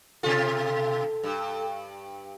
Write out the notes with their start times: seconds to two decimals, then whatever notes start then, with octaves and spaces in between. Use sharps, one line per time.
0.23 B2 F4 A4
1.23 G2